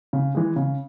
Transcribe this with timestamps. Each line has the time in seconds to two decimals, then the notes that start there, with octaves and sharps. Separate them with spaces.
0.13 C#3
0.35 E3 G#3
0.56 C#3